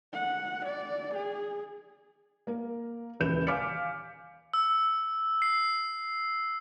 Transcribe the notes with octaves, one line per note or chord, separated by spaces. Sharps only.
F#5
D5
G#4
A#3 A#4
D#1 C#2 E3 G6 E7
F5 G#5 D6 F6 B6 C#7
E6
C7